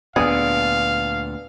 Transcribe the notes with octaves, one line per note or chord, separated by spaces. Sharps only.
D2 A#2 B3 D4 G#4 F5